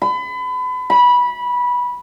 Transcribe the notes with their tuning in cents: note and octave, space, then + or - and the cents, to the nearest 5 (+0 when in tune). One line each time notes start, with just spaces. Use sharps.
B5 +35
B5 -15